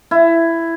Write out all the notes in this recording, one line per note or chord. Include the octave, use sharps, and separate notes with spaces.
E4